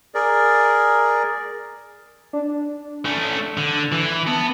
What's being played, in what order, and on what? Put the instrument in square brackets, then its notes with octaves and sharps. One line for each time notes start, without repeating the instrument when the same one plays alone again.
[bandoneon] G#4 A#4 D5
[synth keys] D4
[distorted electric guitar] A3 C#4
D3
E3
[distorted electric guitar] B3 [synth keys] A5